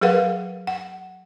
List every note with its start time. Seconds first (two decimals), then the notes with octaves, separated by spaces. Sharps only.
0.01 F#3 G#4 A#4 B4 F5 F#5
0.67 F#5